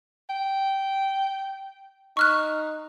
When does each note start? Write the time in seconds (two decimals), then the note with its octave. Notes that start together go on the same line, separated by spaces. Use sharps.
0.30 G5
2.17 D#4 C#6 F6 F#6